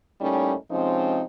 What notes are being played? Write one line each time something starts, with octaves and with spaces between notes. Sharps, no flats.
A2 G3 A#3 C#4 D#4
C3 F3 G#3 C4 C#4 D#4